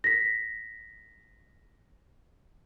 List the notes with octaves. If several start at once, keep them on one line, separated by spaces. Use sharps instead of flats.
A#6 B6